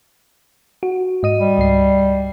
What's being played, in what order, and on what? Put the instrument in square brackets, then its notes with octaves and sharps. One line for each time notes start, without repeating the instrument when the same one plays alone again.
[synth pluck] F#4
G#2 D#5 D#7
[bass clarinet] G3
[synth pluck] C#2 G#2 C7